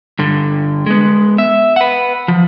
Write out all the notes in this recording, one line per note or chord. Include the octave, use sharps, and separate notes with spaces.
G2 D3
G#3 B3
E5
B4 F#5
F3